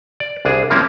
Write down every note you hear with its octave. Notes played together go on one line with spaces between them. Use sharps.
D5
C2 D4 G#4
F3 G3 A#3 C4 C#4 E4